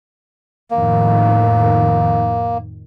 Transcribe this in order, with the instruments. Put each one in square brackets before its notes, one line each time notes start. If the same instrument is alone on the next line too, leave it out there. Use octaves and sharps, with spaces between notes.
[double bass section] F2 A2 D#3 [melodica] A#3